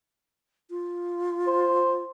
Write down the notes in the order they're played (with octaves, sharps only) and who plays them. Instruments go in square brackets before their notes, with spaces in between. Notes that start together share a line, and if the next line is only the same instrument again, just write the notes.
[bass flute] F4
[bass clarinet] C5